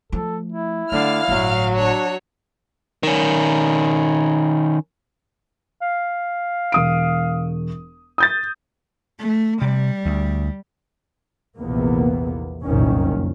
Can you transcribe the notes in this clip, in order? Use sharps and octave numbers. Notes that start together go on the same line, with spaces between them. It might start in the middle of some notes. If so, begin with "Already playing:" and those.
F3 A3 A4
E4
D3 A3 F5 F6
G1 A2 F#3
D4 F#4 C#5
D#3 C#4
F5
E1 D#6 D7
D#6 G6 A6
A3
C3 G3
D2
A#1 E2 C3 A#3 B3
F#1 C2 F2 A#2 D#3 C#4